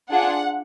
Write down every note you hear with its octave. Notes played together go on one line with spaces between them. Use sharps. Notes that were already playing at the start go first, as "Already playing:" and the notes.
D4 F4 G#4 F#5